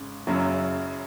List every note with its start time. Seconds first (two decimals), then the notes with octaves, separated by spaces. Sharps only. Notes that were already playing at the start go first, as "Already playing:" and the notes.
Already playing: G#1 C#3
0.27 F#1 F#2 C#3 F#3 E4